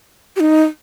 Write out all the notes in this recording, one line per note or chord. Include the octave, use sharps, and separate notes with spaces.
G4
D#4